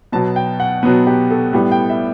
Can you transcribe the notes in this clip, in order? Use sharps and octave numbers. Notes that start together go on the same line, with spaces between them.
B2 F#3 B3 A5
G5
F#5
B2 F#3 B3
G4
A4
A2 G3 B3
G5
E5